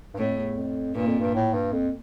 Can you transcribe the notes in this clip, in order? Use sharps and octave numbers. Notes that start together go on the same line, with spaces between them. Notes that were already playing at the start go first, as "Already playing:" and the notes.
G2
F2 A2
E2
F2
G2 A#2
F2
G2
A2
G2
F2